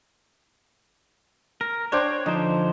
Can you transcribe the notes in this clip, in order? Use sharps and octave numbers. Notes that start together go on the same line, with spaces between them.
A#4
D4 C5 C#5 G5
D3 F3 D#4 C5